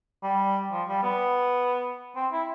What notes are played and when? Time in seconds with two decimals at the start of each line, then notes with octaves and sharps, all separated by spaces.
0.23 G3
0.71 F3
0.88 G3
1.03 B3
2.15 C4
2.32 E4